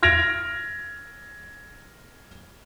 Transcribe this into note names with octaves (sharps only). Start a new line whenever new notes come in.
F6 G#6 A#6 D7 F7